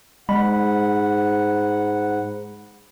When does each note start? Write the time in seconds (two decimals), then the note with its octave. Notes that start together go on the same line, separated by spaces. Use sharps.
0.29 G#2 G#3 F#5 B5